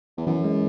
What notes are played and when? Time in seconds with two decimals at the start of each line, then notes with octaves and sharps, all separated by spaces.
0.17 E2
0.27 F#2 E3
0.44 G#3